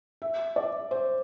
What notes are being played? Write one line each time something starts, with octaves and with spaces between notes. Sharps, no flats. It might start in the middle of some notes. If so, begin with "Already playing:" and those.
E5
D5
C5